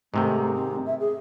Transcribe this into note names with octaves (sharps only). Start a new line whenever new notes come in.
G#2 C3 D#3 A3
C4
E5
G#4